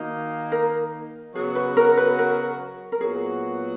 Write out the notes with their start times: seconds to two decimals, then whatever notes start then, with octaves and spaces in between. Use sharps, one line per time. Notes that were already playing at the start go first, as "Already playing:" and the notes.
Already playing: D#3 A#3 D#4 F#4
0.52 A#4
1.35 C#3 F#3 B3 F#4 G#4
1.55 B4
1.77 A#4
1.97 B4
2.19 A#4
2.92 A#4
3.01 A#2 F#3 B3 F#4 G#4